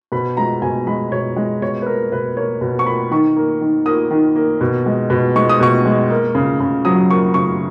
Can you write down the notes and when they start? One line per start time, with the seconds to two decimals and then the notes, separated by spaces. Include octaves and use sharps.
0.12 B2 B5
0.37 G#3 A#5
0.62 B2 G#5
0.87 G#3 B5
1.12 B2 C#5
1.36 G#3
1.62 B2 C#5
1.82 B4
1.86 A#3 A#4
2.12 B2 B4
2.37 A#3 C#5
2.61 B2
2.79 C#6
2.86 A#3 B5
3.11 D#3 C#6
3.36 A#3
3.61 D#3
3.86 A#3 D#6
4.11 D#3
4.36 A#3
4.61 B2
4.86 G#3
5.10 B2
5.36 G#3 C#6
5.49 D#6
5.60 B2 C#6
5.85 G#3
6.10 A#3
6.35 C#3
6.60 C#3
6.85 F#3 D#6
7.09 A#3 C#6
7.34 C#3 C#6